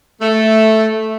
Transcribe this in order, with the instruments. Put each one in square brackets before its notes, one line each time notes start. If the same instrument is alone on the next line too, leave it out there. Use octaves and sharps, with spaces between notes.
[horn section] A3